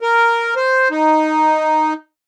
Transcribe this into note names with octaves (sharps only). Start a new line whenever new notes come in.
A#4
C5
D#4